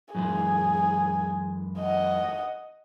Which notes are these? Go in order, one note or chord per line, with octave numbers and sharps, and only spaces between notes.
F#2 E3 G#3 G#4
D#5 F#5